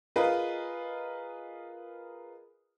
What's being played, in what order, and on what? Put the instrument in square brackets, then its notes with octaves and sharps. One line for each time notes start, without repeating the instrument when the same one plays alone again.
[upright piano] F4 G#4 A#4 B4 D#5